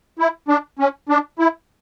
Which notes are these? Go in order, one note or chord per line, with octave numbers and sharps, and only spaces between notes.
E4
D4
C#4
D4
E4